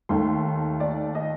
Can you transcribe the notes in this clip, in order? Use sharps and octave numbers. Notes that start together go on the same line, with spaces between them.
D#2 D#3 A3 C6
D5
D#5